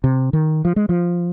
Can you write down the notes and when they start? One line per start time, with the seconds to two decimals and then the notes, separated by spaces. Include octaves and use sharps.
0.04 C3
0.33 D#3
0.65 F3
0.76 G#3
0.89 F3